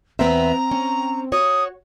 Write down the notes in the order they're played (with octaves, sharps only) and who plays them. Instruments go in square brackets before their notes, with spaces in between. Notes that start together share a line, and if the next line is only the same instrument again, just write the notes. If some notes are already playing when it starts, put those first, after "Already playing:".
[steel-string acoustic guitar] E2 B3 E5 [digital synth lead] C4 [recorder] A#5
[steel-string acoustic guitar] C#4
[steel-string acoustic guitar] F#4 C#5 [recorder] D#6